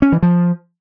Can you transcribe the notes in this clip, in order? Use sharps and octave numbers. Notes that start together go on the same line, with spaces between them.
C#4
E3
F3